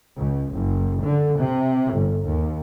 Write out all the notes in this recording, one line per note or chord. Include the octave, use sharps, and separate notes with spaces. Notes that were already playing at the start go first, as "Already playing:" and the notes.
C#2
F#1
D3
C3
G1
D#2